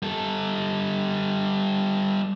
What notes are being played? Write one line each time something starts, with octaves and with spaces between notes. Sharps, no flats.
G3 A4